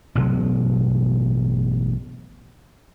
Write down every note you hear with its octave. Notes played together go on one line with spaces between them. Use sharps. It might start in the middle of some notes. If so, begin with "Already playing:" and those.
A1 G2 B2 F#3